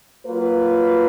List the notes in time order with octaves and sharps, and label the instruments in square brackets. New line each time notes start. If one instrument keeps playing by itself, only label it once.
[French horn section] F#3 A#3 F4 B4